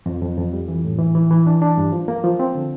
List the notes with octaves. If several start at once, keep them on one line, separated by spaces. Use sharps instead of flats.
F2
F2
F2
G3
E3
A2
E3
E3
E3
D4
D4
G2
F3
A#3
F3
C4
D3